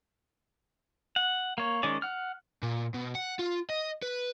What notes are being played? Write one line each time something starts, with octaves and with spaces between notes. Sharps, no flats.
F#5
A#3 C#5
D#3 G#3 C#4 D5
F#5 F6
A#2
B2
F#5
F4
D#5
B4